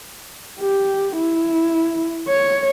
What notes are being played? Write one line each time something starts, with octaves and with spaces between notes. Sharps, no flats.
G4
E4
C#5